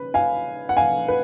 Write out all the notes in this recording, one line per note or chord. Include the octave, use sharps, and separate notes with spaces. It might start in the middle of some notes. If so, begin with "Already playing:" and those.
Already playing: C#3 B4
F5 G#5
F#5
F5 G#5
B4